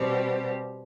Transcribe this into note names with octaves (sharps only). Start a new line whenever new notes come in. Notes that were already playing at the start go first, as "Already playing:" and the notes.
Already playing: B2 G3 C4 G4